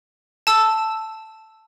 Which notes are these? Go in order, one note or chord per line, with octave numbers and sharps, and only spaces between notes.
A5 E6